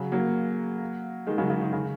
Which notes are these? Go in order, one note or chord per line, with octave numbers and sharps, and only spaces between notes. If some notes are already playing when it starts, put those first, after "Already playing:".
Already playing: C#3 F#3
F#3 A#3
D#3 G#3
C#3 F#3
C#3
D#3
C#3